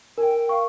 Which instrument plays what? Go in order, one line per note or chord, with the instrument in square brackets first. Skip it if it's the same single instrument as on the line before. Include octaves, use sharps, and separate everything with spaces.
[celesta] A#4 [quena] G5 G#5
[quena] F5 [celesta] C#6